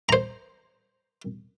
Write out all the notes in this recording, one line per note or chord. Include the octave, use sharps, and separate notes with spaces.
C5 A#5